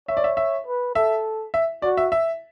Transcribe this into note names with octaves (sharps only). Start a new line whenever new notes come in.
C#5 E5
D5
E5
E5
B4
A4 E5
E5
F#4 D5
E5
E5